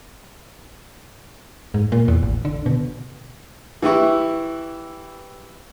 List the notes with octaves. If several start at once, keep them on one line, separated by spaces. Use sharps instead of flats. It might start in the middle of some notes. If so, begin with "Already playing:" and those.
G#2
A#2
E2
A1
D3
B2
E3 E4 G4 E5 C#6